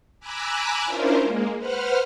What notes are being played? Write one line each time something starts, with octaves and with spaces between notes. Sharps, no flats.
G#5 A#5 B5 D6 E6 F#6
C#4 D4 E4 F4 A#4 C5
G#3 A#3
B4 C5 F#5 F6